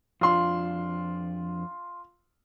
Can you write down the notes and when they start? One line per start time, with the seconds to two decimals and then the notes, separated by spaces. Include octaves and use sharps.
0.21 F2 D4 F4 C6